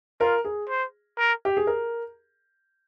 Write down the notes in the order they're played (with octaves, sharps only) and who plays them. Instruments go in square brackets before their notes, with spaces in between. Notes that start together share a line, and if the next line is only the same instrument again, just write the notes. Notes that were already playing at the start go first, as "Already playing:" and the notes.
[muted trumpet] F4 [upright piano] A#4
[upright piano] G#4
[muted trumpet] C5
A#4
[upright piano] G4
G#4
A#4